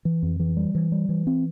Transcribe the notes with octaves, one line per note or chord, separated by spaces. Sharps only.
E3
F2
E3
G3
E3
G3
E3
C4